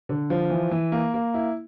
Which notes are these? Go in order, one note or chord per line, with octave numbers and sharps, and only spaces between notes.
D3
F3
E3
E3
A#3
A#3
E4